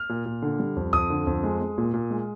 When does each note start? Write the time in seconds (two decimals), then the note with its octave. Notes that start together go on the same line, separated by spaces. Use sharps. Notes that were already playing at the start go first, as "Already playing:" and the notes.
Already playing: F6
0.09 A#2
0.26 A#2
0.42 D3
0.60 G3
0.76 F2
0.93 F2 D#6
1.10 D3
1.27 F2
1.44 G#3
1.61 G#3
1.78 A#2
1.94 A#2
2.11 G#3